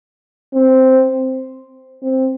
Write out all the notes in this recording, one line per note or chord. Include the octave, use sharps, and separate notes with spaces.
C4
C4